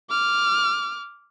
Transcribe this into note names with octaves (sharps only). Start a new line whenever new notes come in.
D6 F6